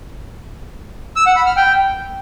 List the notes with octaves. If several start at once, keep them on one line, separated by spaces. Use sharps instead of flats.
E6
F#5
B5
F6
G5